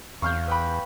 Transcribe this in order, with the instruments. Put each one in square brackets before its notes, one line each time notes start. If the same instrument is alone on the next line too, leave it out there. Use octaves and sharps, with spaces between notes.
[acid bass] E2 [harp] F5 [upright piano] C#6 F6 G6
[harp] B4 G5 B5